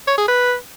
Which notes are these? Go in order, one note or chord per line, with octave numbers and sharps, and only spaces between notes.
C#5
G#4
B4